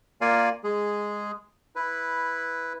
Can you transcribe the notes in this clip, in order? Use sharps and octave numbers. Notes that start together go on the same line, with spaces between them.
A#3 F4 A#4 D5 F5 G#5
G#3 G#4
E4 B4